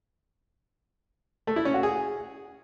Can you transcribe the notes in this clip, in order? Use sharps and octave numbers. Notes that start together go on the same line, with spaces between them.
A3
E4
C#4
F#4
G#4